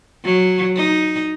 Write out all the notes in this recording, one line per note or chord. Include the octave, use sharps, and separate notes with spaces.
F#3
D#4